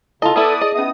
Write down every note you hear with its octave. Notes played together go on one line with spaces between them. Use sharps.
C#3 E4 F4 A4 D#5 A5
B3 E4 A4 B4 D5 D#6
G#4 D#5
B3 C#4 E5 D#6